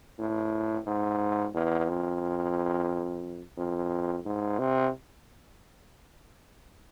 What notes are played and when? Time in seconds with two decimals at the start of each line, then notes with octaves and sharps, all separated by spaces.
0.19 A2
0.87 G#2
1.54 E2
1.88 F2
3.57 F2
4.25 G#2
4.59 C3